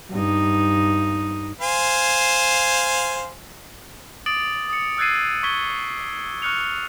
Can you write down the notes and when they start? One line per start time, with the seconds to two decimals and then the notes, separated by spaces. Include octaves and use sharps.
0.11 G2 D#4
1.61 C5 F5 G#5
4.26 D6 D#6 A6 D7 F#7
4.69 D#6 C#7
4.98 E6 F#6 G#6 A6 C7 D#7
5.43 C#6 G#6 B6 G7
6.42 C#6 F6 F#6 C#7 F7